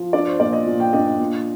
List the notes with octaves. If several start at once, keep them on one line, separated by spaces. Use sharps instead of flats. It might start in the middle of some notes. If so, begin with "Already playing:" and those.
Already playing: F3
D4 D5
C5
A#2 D5
D#5
A#2
G5
D4 D#5
D#5
A#2